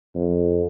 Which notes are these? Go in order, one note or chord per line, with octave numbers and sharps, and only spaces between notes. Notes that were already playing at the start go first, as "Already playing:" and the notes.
F2